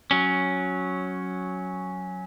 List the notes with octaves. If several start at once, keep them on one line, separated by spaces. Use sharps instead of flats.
F#3 C#4